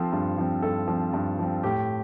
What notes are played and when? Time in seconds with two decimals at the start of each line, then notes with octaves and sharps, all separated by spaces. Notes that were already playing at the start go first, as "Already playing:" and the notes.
Already playing: F3 C4 A4
0.13 G2
0.38 F3 C4
0.62 G2 A4
0.88 F3 C4
1.13 G2
1.39 F3 C4
1.63 A2 G4